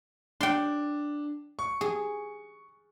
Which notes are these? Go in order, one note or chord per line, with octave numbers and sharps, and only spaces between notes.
D4 G5 C6
C#6
G#4